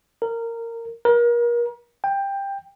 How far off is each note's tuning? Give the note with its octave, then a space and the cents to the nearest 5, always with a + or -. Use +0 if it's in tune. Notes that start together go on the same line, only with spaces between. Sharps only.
A#4 -15
A#4 +35
G5 +15